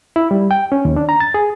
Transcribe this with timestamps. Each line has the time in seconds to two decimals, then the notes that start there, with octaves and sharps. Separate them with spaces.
0.16 E4
0.31 G3
0.51 G5
0.72 C#4
0.85 D#2
0.96 D4
1.09 A#5
1.20 A6
1.34 G#4